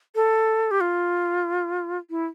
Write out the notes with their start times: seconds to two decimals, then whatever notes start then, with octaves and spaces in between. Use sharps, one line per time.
0.15 A4
0.71 G4
0.81 F4
2.10 E4